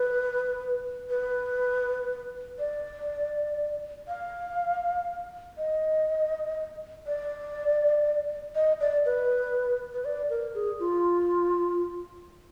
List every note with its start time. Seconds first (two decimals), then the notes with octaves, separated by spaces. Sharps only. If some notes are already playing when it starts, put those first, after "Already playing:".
Already playing: B4
1.10 B4
2.59 D5
4.08 F5
5.58 D#5
7.07 D5
8.55 D#5
8.80 D5
9.06 B4
9.93 B4
10.05 D5
10.30 A#4
10.55 G#4
10.80 F4